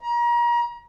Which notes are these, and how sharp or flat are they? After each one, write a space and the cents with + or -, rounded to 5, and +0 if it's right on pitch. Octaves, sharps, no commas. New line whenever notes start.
A#5 +35